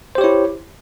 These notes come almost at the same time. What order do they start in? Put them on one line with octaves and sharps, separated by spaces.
C5 G4 C#5 E4